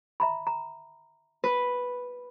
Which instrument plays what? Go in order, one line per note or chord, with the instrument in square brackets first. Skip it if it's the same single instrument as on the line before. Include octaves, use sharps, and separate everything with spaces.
[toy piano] E5 A#5 B5
A#5
[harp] B4